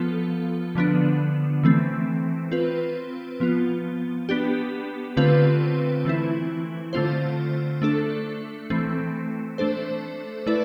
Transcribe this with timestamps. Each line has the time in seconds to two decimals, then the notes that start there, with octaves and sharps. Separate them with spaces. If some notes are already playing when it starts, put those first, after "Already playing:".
Already playing: F3 B3 F4 A4
0.75 D3 F3 B3 D4
1.63 E3 A3 C4
2.51 C4 F4 B4
3.40 F3 B3 F4
4.29 B3 D4 G4
5.17 D3 A3 C4 F4 B4
6.05 E3 A3 C4 E4
6.93 D3 A3 C4 F4 C5
7.82 A3 D4 A4
8.70 E3 A3 C4
9.58 A3 D4 A4 C5
10.47 A3 E4 B4 D5